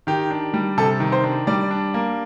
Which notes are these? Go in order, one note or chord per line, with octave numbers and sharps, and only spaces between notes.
D#3 G4
D4
G3
C3 A4
D#3
C5
D4
G3 D5
D4
A#3